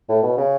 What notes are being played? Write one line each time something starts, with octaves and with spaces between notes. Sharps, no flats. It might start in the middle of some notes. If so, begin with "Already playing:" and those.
A2
B2
C#3